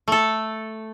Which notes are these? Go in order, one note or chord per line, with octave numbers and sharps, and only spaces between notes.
A3 A4